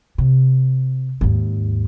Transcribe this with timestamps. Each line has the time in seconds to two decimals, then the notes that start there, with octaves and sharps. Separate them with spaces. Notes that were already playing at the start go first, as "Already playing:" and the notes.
0.18 C3
1.21 D#2 G#2